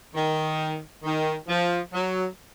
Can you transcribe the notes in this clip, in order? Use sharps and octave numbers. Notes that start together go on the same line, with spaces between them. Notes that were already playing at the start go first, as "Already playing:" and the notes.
D#3
D#3
F3
F#3